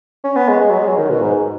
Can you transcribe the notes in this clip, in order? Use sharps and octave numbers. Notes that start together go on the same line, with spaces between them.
C#4
B3
G#3
G#3
F#3
G#3
F#3
D#3
B2
G#2